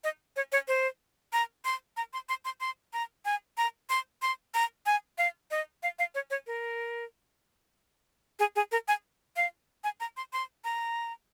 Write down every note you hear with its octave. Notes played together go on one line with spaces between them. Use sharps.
D#5
C#5
C#5
C5
A#5
C6
A#5
C6
C6
C6
C6
A#5
G#5
A#5
C6
C6
A#5
G#5
F5
D#5
F5
F5
C#5
C#5
A#4
G#4
G#4
A#4
G#5
F5
G#5
A#5
C6
C6
A#5